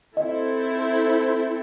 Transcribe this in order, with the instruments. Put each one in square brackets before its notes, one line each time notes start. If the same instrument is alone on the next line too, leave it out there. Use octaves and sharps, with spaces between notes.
[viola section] C4 E4 A4 [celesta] D#5